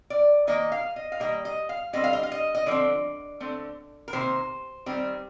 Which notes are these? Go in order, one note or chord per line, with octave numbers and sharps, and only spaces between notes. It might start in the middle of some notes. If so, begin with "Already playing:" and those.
D5
D#3 A#3 D#5
F5
D#5
F5
D#3 G3 A#3 D#5
D#5
F5
D3 G3 C4 D#5
F5
D#5
F5
D#5
D#5
D3 F3 C4 D5
D3 A3 C4
A#4
C3 D#3 A#3 C5
D#3 G3 C4